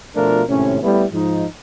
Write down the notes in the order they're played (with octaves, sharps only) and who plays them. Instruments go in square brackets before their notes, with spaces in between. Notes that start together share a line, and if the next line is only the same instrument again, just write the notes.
[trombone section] B2 F3 A3 D4 F4 A#4
G#1 A2 C3 C#4
G3 A3 B3 E4
G#2 F3 D#4